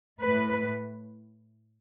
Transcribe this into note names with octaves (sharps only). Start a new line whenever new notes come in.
A2 A3 B4